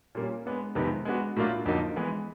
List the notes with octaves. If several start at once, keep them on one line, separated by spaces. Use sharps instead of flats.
A#2 G3 A#3 C#4
G#3 B3 D4
F2 C3 D#3 G#3 B3
G#3 B3 D4 F#4
A2 F#3 A#3 D4 F4
F2 D3 F#3 A#3 D#4
E3 G#3 B3